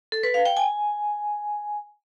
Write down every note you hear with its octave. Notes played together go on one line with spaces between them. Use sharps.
A4
B4
F5
G5
G#5